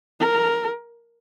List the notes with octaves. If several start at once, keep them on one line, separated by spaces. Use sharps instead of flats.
A#4